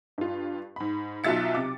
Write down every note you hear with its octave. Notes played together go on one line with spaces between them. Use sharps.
G2 F4
G#2 B5
B1 F#3 F4 E5 A6 C#7
C3 D6